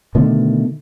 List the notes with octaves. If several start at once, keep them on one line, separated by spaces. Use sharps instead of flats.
B2 D3 D#3 A3